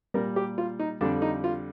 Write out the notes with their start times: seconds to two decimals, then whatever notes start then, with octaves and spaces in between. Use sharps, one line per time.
0.14 A#2 G3 A#4
0.36 G4
0.58 F4
0.79 D#4
1.01 F2 D3 G3 D4
1.22 D#4
1.44 F4